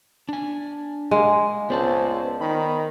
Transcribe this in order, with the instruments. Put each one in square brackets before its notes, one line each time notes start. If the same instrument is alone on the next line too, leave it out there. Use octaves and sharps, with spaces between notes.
[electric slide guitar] D4 G#5
[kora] G#3 A#3
[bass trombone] C#2 [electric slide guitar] B3 D5 A5 [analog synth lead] C5
[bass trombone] D#3 [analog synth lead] B5